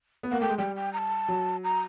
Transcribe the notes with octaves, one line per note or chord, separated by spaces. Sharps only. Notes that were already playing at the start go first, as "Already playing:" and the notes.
B3
A#3 F#5
A3 G5
G#3
G3 G5
G5
A#5
A5
F#3
A#5